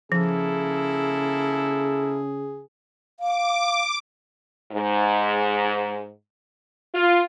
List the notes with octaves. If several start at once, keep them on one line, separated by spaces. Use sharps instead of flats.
C#3 F3 A#3 E4 G#4 A4
F5 D6
G#2
F4